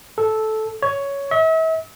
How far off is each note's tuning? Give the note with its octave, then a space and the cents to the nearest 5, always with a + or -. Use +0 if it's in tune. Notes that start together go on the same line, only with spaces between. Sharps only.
A4 -10
C#5 +10
E5 -40